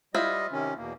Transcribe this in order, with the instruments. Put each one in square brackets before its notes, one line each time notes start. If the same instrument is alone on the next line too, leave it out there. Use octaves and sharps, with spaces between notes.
[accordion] G3 D#5 [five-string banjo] E4 F4 C5
[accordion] C3 D#3 C#4
E2 B2 A#3